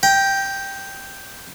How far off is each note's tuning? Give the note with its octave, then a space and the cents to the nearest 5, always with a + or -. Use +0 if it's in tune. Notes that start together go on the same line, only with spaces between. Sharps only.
G5 +0 A#5 +35